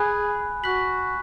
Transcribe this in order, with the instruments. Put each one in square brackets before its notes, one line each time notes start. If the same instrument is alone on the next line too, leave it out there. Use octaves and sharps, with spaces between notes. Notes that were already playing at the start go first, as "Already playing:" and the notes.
Already playing: [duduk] G#4 [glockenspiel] G#5 B5 F#6
[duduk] F#4 [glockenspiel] F#6 B6 F#7